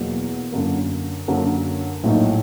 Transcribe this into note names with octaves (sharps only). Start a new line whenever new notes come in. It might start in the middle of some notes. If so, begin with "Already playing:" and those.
Already playing: E2 B2 F#3 A#3
F#2 D3 F#3 A#3
F#2 D3 F#3 A#3
A#1 A2 F#3 A#3 D#4